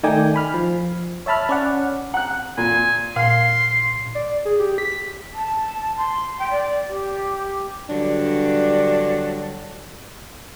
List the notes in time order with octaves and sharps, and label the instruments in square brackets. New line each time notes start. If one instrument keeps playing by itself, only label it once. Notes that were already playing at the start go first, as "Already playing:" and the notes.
[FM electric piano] D#3 A3 D#4 D5 G5 G#5
G#5 B5 F6
F3
C#5 E5 A5 B5 F6
C#4 D5 F#5
[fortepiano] F#5 F#6 [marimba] A#5
[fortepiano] A#2 [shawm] G#5
[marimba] A#2 [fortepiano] F5 [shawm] C6
[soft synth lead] D5
G#4
G4
B6
[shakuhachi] A5
C6
G5
D5
G4
[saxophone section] G2 D3 F#3 D4